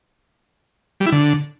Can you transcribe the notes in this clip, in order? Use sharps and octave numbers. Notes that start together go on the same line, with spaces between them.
G3
E4
D3